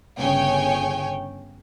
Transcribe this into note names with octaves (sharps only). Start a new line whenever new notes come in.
G1 C#3 C#5 G5 G#5